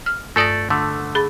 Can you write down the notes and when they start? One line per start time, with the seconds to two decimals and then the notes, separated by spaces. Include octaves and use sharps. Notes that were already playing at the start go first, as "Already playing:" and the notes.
0.06 F6
0.36 G2 A3 A4 D5 D#6 A#6
0.70 D3 A3
1.15 G#4 B5 A6